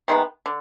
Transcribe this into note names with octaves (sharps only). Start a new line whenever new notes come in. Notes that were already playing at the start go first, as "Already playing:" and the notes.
C3 D#3 G#3 B3
D3